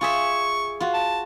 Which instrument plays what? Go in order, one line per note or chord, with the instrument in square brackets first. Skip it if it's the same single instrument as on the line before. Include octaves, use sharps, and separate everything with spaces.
[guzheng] F4 G#4 E5 [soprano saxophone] C#6
[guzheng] F4 F#4
[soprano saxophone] A5